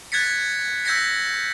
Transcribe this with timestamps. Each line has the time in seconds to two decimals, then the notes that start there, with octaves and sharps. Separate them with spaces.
0.12 F#6 G#6 A6 B6 C#7
0.85 E6 G6 G#6 A#6 B6 C#7